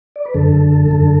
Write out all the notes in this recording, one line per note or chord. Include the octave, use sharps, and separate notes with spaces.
D5
B4
F#2 D3 A4
F#2 D3